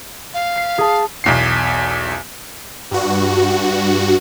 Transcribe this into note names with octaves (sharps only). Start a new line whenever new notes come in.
F5
B6 C7
G#4 A5
B1 E2 C7
G2 F#4